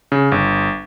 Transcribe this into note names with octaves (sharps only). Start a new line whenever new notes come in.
C#3
G1